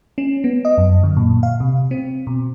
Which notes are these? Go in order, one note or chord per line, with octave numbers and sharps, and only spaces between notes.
C#4
B3
D#5
F#2
D3
A#2
F5
C3
C4
B2